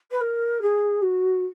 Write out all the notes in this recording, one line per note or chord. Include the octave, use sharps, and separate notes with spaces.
B4
A#4
G#4
F#4